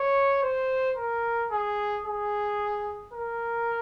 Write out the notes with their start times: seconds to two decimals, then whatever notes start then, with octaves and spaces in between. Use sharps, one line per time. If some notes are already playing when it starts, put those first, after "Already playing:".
Already playing: C#5
0.43 C5
0.97 A#4
1.51 G#4
2.05 G#4
3.13 A#4